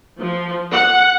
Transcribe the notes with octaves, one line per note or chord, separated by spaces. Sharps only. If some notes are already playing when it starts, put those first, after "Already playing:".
F3
F#5